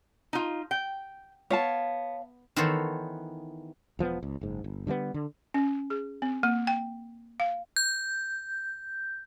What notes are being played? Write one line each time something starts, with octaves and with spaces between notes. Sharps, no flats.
D#4 F4
G5
B3 C#5 F5 A5
D#3 E3 B3 A4 C5 C#5
E1 F3 A#3 B3
C#2
F#1 G#2
G1
D3 G3 G#3 B3
D3
C#4
G#4
C4
A#3
G5
F5
G6